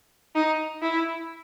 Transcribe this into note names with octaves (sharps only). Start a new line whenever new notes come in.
D#4
E4